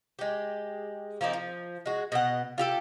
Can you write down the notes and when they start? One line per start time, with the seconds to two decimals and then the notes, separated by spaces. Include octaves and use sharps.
0.19 G#3 G4
1.21 F3 A#3 C4 D#4
1.33 F3
1.86 G#3 F#4
2.12 B2 D#5 F#5
2.58 F4 G4 A4